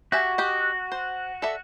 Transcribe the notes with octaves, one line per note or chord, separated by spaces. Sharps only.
F#4 G4 E5 G#5
G4 D#5
C5
A4 D5 E5